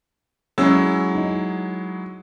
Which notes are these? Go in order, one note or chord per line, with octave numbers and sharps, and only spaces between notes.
F#3 G#3 C#4 E4 E6
D#4